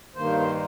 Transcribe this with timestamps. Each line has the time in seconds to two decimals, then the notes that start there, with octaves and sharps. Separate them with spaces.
0.15 G2 D#3 A#3 C5
0.40 C5